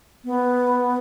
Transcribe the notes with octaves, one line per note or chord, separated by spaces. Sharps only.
B3